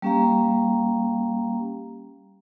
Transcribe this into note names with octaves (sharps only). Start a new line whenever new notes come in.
G3 A#3 C#4 G4 F5 A#5